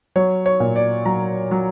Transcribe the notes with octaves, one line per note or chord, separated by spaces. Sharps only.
F#3 C#5
C#5
A#2
D5
F#3 A#5
F#3